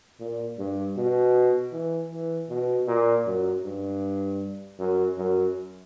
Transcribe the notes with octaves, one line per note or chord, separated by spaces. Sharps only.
A#2
G2
B2
E3
E3
B2
A#2
F#2
G2
F#2
F#2